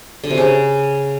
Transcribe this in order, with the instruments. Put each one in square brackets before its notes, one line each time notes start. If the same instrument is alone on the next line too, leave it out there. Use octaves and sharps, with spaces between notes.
[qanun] D3
C3
C#3